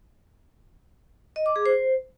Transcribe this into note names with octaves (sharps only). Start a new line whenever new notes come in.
D#5
D6
G#4
C5